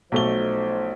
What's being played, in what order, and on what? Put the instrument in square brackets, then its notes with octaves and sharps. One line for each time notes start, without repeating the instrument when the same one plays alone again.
[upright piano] B1 A3 G7 [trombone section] F3 D#4 C5